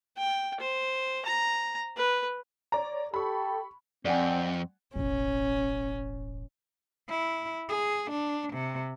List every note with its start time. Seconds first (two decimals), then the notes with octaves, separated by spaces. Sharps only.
0.18 G5
0.60 C5
1.25 A#5
1.97 B4
2.72 C#5 D5 A#5
3.14 G4 A4 B5 C#6
4.05 F2 C4 D5 F#5 G#5
4.96 E1 A1 C#4
7.09 E4
7.69 G#4
8.11 D4
8.54 C3